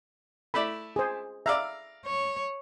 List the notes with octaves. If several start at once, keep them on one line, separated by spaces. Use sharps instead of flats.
A3 E4 D5 B5
G#4 C5
D5 E5 F5 A#5
C#5